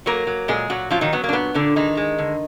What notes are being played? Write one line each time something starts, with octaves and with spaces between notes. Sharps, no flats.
F#3 A#3 A#4
F#3
A#2 G#3 G#4
A#2 F#3 F#4
F3 F#3 F4
D#3 D#4
F#3 B3
A#3
D4
A#2 B3
A#2 D3 D4
D#3 G#3 D#4
G#3
D3